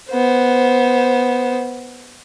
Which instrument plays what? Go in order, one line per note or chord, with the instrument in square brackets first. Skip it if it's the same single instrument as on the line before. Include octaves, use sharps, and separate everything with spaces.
[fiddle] B3 C5